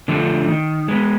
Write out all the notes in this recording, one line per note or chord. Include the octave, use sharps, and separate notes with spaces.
D3 F3 A3 D4
D#3
G#3 B3